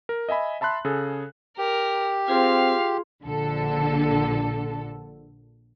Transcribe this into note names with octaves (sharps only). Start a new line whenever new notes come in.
A#4
D#5 E5 G#5 B5
E5 A5 B5 C6 F#6
C#3 G#4 A4
G4 A#4
C4 F4 G#4 F5 C6
A#1 D3 A4